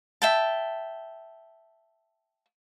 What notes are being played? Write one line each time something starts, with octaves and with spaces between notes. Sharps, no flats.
E5 G5 A5